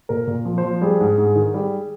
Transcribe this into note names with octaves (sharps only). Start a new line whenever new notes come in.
A#2 A#4
A#2
F3
C5
F3
G3 G#4
G#2
G#2
D#3
G3